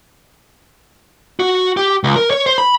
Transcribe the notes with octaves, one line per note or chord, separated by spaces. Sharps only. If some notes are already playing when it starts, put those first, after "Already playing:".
F#4
G4
C#2
A#4
C#5
C5
B5